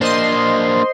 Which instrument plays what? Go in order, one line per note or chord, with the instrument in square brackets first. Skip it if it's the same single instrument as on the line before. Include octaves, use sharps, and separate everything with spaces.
[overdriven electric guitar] A#3 D4 [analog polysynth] C5 D#5 C6